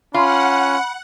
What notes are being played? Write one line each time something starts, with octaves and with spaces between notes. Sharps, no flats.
C#4 F4 F#5 B5